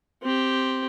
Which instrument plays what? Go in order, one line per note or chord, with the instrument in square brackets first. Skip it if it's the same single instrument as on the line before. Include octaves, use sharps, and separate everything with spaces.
[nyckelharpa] C4 G4